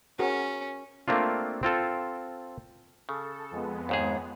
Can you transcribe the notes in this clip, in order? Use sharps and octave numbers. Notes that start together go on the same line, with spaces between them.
C#4 F#4 G#4 A#4
A3 A#3 C4 D4 F4
C4 F4 A4
C#3 A4
F2 G#3 B3
D#2 G#2 G#4